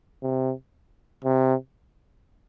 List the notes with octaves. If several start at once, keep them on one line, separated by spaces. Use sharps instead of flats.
C3
C3